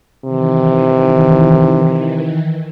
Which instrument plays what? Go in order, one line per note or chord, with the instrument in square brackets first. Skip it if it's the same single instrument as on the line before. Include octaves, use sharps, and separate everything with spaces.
[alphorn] C3 [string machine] D#3 E3